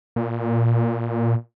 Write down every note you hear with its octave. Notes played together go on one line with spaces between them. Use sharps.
A#2